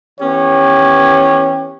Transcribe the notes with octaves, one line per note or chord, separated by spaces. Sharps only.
E3 B3 C#4 G4 C#5